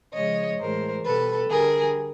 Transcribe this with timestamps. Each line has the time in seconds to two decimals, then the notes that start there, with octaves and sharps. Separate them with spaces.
0.13 C#3 F3 G#3 C#5 D#5
0.59 A2 E3 G#3 A#4 C5
1.04 B2 G3 A4 B4
1.50 D3 G3 G#4 A#4